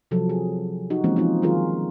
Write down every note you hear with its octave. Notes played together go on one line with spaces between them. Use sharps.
C3 F3 F#3 A4
G#4
D#4 F#4 G4
E3 F3 G#3 A#3 C4 C#4
F3 C4 D#4 F4
D#3 F#3 F4 G#4 A#4